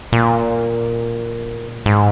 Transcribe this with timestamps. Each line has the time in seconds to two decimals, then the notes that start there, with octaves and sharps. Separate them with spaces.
0.12 A#2
1.86 G#2